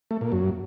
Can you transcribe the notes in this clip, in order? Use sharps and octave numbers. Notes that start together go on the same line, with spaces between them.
A3
A#2
F#2